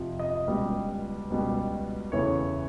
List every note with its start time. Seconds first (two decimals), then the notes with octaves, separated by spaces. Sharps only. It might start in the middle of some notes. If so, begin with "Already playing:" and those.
Already playing: F2 C3 F3
0.19 D#5
0.47 C#2 B2 G3
1.30 C#2 B2 G3
2.12 E2 C#3 E3 A3 C#5